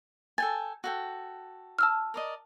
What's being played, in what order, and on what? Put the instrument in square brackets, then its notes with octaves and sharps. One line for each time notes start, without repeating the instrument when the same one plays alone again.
[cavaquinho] A4 G5 G#5 [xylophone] A6
[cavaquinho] F#4 A4 G5
[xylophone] A5 E6 F6
[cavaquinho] A#4 D5 D#5